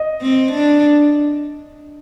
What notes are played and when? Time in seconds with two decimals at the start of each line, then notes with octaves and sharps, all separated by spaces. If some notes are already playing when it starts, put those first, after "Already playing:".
Already playing: D#5
0.22 C4
0.52 D4